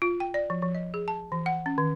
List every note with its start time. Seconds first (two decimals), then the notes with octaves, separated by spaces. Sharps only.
0.02 F4
0.20 G5
0.34 D5
0.50 F3
0.62 F3
0.75 D#5
0.94 G#4
1.08 A5
1.32 E3
1.46 F#5
1.66 C#4
1.78 D#3